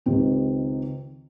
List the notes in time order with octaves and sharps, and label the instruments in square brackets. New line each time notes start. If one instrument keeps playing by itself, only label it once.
[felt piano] C#2 D#3 C4 G4